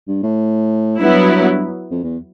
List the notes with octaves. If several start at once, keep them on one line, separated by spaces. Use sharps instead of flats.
G2
A2
G2 F#3 B3 E4
F2
E2